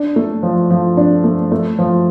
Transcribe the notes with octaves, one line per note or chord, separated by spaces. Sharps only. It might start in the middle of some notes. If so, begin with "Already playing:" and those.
Already playing: D4
A3
F3
F3
D4
A3
A3
F3